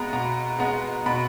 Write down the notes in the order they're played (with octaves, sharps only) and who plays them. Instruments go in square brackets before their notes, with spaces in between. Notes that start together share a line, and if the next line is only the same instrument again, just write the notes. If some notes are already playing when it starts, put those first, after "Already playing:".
Already playing: [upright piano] B2 G#3 B3 A#5 B5
B2 A#5
G#3 B3 A#5
B2 B5